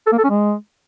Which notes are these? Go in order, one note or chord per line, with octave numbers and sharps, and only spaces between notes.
A4
A#3
A4
C#4
G#3